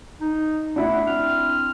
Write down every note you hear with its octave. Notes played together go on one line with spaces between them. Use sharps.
D#4
A3 D4 E4 F#5 B5
C4 F6